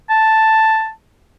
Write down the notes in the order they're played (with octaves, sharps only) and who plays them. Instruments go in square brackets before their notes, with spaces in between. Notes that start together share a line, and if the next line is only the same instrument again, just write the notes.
[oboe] A5